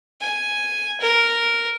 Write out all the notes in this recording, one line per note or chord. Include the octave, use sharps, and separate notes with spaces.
G#5
A#4